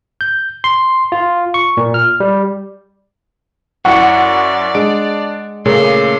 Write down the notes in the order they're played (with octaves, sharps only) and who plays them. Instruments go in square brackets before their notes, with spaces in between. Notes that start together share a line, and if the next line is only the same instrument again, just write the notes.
[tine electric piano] G6
C6
F4
C#6
A#2
F6
G3
[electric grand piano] F#2 E4 C#6 [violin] D5 [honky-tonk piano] F#5
[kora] G#3 [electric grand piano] D4 D7
[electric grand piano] A#2 A3 [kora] C#3 A#3 [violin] C6 D6